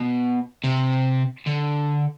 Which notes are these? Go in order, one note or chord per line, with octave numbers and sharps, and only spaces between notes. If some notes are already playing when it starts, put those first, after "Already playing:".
Already playing: B2
C3
D3